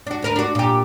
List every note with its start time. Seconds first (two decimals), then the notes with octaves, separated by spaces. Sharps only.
0.07 D4 F#4
0.22 D2 A#4 B4
0.36 D4 F#4
0.55 A#2 G4